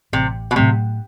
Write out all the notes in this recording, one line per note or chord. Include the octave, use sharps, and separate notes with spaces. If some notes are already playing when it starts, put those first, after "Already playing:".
A1 C3
B2
A2 C3 F#3 A3